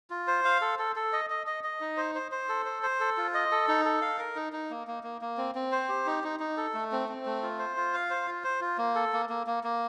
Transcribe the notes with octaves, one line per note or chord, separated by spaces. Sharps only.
F4
C5
F5
A4
A4
A4
D#5
D#5
D#5
D#5
D#4
C5
C5
C5
A4
C5
C5
A4
F4
D#5
A4
D#4
A4
F5
A#4
D#4
D#4
A#3
A#3
A#3
A#3
C4
C4
C5
G4
D#4
D#4
D#4
A4
A3
C4
C4
A3
F4
C5
F4
F5
C5
F4
C5
F4
A#3
A4
A#3
A#3
A#3
A#3